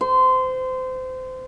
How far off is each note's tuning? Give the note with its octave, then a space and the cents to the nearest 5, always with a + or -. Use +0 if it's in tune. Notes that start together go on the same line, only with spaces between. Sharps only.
C5 -25